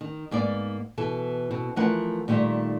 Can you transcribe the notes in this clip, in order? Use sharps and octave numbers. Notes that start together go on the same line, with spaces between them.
D#3
G#2 A#3 B3 D5
B2 E3 A4
B2 C4
E3 F3 A3 A#4 B4 F#5
A#2 D#3 G3 A3 C4